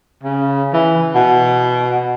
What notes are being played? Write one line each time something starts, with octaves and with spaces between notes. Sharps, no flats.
C#3
E3
B2